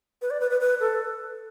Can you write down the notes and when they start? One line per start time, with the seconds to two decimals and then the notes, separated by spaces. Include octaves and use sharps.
0.22 B4
0.30 D5
0.40 B4
0.50 B4
0.61 B4
0.80 A4